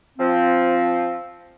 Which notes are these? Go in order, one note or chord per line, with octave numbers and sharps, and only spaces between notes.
F3 C4